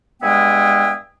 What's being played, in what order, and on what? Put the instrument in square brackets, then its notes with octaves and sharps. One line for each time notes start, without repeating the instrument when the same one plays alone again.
[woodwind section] G2 G#3 B3 G#4 E5 G5